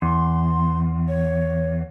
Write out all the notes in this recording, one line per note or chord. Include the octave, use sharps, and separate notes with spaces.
E2 C6
C#5